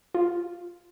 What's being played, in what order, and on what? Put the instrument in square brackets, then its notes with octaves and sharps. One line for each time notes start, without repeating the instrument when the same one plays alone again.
[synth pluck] F4